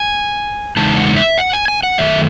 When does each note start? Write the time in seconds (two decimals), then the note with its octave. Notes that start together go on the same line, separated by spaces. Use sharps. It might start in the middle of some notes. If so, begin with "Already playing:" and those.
Already playing: G#5
0.77 E2 C#3 G#3 D#4 A5
0.97 F#5
1.17 E5
1.38 F#5
1.53 G#5
1.68 G#5
1.83 F#5
1.98 F#2 D#3 A3 E5